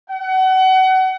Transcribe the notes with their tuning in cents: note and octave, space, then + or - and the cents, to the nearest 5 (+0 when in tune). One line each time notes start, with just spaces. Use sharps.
F#5 +30